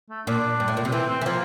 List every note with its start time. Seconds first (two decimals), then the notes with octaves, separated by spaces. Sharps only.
0.10 A3
0.27 A#2 D4
0.60 G2
0.68 A2
0.77 A#2
0.85 C3
0.92 E3 C4
1.09 C4
1.21 E3
1.26 F3 A#3